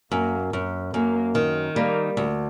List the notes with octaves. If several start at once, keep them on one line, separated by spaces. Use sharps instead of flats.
F#2 A#3
F#2
F#2 A#3
D#3
G3 A#3
D2